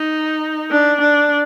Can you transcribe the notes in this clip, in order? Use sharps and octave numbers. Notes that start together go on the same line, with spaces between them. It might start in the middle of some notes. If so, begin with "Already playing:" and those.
Already playing: D#4
D4
D4